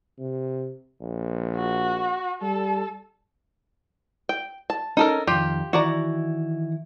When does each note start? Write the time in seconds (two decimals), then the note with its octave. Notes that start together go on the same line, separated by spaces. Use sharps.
0.19 C3
1.01 A#1
1.56 F#4
2.42 G3 A4
4.29 G5
4.70 A5
4.97 C#4 D#4 A4 A#4
5.27 F2 D#3 F4 G4
5.73 D#3 E3 E4 F#4 D5 A#5